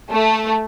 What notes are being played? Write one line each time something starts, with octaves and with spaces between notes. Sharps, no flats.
A3